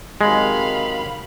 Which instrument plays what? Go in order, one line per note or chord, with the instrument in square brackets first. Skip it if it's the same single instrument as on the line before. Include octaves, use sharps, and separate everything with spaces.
[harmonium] C3 D#3 F#3 [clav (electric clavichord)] G#3 [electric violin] F5 B5